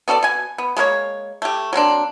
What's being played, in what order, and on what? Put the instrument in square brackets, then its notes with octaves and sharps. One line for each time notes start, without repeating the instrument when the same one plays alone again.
[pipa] B3 F#4 A4 D5
B2 G#5
B3
G#3 A#3 A#4 C#5
A3 G4
F#3 A#3 C4 D4